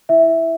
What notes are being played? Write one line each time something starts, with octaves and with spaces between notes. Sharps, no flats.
E4 E5